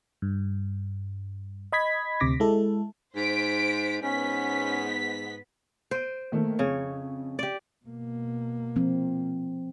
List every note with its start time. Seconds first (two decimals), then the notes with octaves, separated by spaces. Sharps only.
0.22 G2
1.72 D#5 B5 G#6 B6
2.20 D2 C3 D6 A#6 B6
2.40 G#3 E4 A4
3.15 G#2 C5 B6 D7
4.01 G#2 B3 C#4 B6
5.91 C5 D7 D#7
6.32 D#3 A3 A#3
6.59 F2 C#3 C#5
7.39 G4 D5
7.85 B2 A#3
8.76 F3 C4